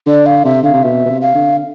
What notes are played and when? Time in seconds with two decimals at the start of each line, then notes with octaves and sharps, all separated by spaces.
0.06 D3 D5
0.26 F5
0.45 C3 E5
0.62 D3 F5
0.73 C3
0.83 B2 E5
1.05 B2
1.09 C3
1.21 F5
1.35 D3